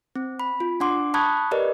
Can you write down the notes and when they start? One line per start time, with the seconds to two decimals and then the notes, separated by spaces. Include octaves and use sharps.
0.16 C4
0.40 B5
0.60 F4
0.80 D4 F#5 C6 D6
1.14 A5 B5 C#6 D#6 F#6 G#6
1.51 G4 A#4 B4 D5 D#5